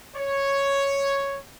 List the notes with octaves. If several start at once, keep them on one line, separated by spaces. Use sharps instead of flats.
C#5